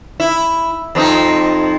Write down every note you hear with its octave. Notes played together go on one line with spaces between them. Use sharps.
E4
F2 C4 D#4